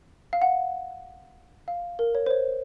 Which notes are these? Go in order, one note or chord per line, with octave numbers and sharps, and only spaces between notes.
F5
F#5
F5
A#4
C#5
C5
C#5